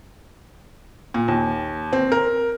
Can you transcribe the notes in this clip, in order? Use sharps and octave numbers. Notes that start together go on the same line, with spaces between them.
A#2
D#2
C4
A#4